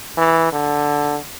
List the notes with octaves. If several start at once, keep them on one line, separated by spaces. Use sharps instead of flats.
E3
D3